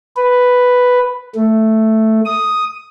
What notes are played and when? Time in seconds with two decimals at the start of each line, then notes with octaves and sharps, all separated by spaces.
0.16 B4
1.35 A3
2.25 D#6